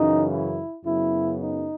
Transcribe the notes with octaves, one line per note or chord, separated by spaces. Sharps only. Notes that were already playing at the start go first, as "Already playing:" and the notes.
Already playing: F#2 C#3 E3 D#4
E4
F#2 C#3 F#3 B3 E4
D#4